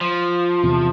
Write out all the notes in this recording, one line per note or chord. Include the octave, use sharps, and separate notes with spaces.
F3
E2 C3